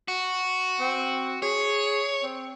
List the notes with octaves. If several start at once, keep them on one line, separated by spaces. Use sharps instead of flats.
F#4
C4
G#4 C#5
C4